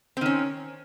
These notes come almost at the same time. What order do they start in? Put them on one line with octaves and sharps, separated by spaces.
C4 D#3 C#4